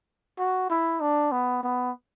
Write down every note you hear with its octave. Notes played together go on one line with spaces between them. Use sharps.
F#4
E4
D4
B3
B3